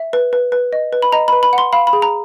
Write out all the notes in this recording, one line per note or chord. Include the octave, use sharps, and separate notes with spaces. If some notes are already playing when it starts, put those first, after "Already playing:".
Already playing: E5
B4
B4
B4
D#5
B4
B5
D#5 A#5
B4 B5
B5
F#5
C6
F5 B5
B5
G#4
A#5